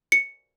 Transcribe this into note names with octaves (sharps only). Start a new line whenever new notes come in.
C#7